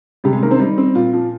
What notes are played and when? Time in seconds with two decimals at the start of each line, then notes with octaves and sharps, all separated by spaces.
0.24 C3 G3 G4
0.33 G#3 G#4
0.42 D#3 A#3 A#4
0.51 C4 C5
0.60 G3 D#4
0.78 C4
0.95 A#2 F4
1.13 F3 F4